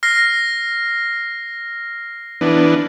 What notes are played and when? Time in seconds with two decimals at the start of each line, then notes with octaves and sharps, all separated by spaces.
0.03 F6 A#6 C7
2.41 E3 B3 D4